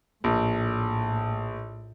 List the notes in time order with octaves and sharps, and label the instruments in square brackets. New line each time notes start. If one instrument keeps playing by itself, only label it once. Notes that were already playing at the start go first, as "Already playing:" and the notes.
[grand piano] A#1 [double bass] A2